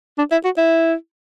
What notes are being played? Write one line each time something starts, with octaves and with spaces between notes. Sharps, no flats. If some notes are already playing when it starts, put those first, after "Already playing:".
D4
E4
F#4
E4